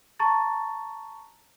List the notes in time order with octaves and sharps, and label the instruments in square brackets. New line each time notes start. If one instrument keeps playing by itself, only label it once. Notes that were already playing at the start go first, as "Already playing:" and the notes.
[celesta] A5 A#5 C#6 A6